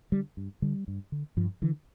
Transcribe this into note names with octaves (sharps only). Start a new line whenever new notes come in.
D3 G3
G2
D3 G3
G2
D3
G2 F3
D3 E3